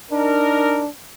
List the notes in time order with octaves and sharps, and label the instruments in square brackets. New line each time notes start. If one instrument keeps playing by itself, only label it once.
[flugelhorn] D4 [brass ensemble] D#4 A#4